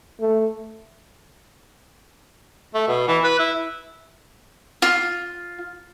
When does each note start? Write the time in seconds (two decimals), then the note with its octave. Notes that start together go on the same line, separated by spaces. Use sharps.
0.20 A3
2.74 A3
2.88 B2
3.08 E3
3.24 B4
3.39 E4
4.82 F4